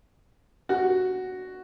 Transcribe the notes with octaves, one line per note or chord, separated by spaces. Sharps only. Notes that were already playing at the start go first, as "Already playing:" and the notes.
F#4